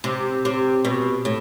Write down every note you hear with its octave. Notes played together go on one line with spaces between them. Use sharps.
C3
C3
B2
A2